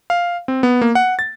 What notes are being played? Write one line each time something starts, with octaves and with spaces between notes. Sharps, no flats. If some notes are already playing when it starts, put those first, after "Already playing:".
F5
C4
B3
A#3
F#5
A6